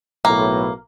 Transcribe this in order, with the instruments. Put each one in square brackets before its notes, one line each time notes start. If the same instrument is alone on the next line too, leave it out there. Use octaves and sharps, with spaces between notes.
[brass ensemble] B1 A2 [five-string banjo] A#3